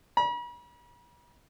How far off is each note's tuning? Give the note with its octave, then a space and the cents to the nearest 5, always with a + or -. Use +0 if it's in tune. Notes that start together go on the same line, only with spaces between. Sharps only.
B5 -45